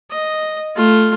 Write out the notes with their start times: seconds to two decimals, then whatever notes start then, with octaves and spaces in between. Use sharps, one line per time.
0.11 D#5
0.76 A3 F4